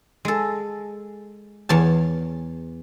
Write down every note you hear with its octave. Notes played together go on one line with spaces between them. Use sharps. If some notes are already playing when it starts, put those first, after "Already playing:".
G#3 A4
E2 C#5 A5